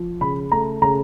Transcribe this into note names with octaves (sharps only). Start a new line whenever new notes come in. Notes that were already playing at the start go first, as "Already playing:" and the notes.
Already playing: F3
C#3 B5
A3 A#5
C#3 A#5